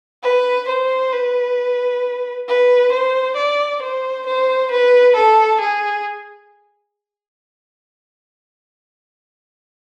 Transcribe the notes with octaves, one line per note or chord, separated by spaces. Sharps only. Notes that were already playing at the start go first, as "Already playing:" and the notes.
B4
C5
B4
B4
C5
D5
C5
C5
B4
A4
G#4